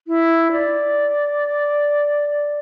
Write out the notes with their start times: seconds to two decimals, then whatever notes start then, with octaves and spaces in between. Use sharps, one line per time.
0.08 E4
0.52 D5